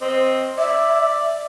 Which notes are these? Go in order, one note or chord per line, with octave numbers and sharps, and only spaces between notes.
C4 D#5
D5 E5